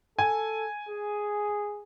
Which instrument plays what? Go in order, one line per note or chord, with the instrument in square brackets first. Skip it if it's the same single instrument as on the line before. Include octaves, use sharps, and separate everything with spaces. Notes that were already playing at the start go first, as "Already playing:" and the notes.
[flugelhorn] A4 [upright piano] G#5
[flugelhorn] G#4